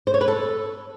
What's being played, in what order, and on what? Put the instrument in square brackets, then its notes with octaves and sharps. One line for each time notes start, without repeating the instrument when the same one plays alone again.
[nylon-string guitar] C5
C#5
B4
A4